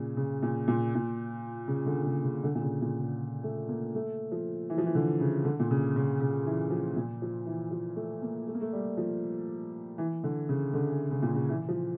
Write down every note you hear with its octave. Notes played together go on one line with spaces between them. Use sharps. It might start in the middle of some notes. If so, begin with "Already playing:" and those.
Already playing: A#2 C#3
C#3
A#2
A#2
A#2
C#3
D3
C#3
C#3
D3
A#2
C#3
A#2
C#3
A3
A#3
A3
F3
E3
F3
E3
D3
C#3
D3
A#2
C#3
C#3
C#3
E3
F3
A#2
F3
E3
F3
A3
A#3
A3
A#3
A3
G3
F3
E3
D3
C#3
D3
C#3
A#2
C#3
E3
F3